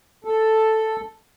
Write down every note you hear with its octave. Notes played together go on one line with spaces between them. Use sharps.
A4